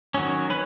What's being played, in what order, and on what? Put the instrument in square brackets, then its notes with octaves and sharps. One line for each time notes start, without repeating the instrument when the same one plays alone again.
[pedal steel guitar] D#3 F#3 C#4
C#4 B4